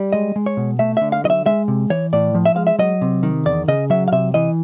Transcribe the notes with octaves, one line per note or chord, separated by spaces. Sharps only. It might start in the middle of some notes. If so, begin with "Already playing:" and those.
Already playing: G3
G#3 D#5
G#3
C#5
B2
A3 E5
D3 E5
F5
F#3 D#5
E5
G#3 E5
C3
E3 C#5
A2 D5
F3
E5
G#3 F5
E5
F#3 D#5
C3
D#3
E2 D5
C#3 D#5
F#3 E5
F5
C3 E5
E3 D#5